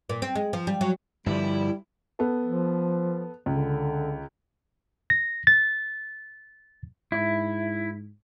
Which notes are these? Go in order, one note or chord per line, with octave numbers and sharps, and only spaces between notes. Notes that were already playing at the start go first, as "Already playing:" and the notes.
A#2
C4
G#3
F3
G3
F#3
G2 D3 F3 G3 E4
B3 A4
F3
C#2 D3
A#6
A6
G#2 E4